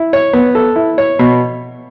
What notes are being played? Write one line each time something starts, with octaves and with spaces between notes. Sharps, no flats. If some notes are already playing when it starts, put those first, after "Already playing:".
Already playing: E4
C#5
B3
A4
E4
C#5
B2